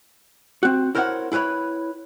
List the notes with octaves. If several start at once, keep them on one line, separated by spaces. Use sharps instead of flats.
C4 F#4
E4 A#4 C5 C#5 D#5 F#5
E4 G#4 B4 C#5 B5